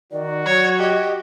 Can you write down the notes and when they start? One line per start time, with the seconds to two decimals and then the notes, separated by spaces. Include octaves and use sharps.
0.12 D#3 F#4 D5
0.46 F#3 C#5
0.80 G4 D#5